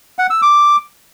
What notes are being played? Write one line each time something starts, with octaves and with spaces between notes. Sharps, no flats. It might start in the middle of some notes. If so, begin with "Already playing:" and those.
F#5
E6
D6